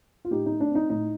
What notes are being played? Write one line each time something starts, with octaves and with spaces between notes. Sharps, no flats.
F4
A2 D#4 G4
A3 D#4
D4
C4
D#4
A2 D#4